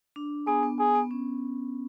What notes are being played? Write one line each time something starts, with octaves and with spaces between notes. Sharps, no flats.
D4
B3 G#4
B3
B3 G#4
B3
C#4